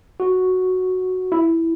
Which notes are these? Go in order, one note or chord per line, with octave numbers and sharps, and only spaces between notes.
F#4
E4